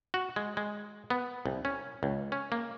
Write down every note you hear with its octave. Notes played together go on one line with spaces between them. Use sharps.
F#4
G#3
G#3
B3
C2
C#4
C#2
C#4
A#3